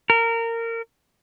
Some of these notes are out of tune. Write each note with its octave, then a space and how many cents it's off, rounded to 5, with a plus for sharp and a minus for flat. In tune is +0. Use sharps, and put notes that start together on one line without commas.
A#4 -20